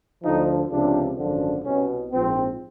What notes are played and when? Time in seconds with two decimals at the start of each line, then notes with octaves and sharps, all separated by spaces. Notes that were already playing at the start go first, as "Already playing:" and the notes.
0.22 D2 D3 F3 D#4
0.69 C#2 C3 F3 D4
1.16 G#1 F#2 D3 F3
1.63 C2 B2 C#4
2.10 A#1 G#2 F3 C4